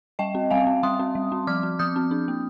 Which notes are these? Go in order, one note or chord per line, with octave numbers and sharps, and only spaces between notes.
G3 D#5 G5
C4
G3 F5 G#5
C4
G3 C6 D#6
C4
G3
C4
F3 D6 F6
C4
F3 D#6 G6
C4
D4
A#3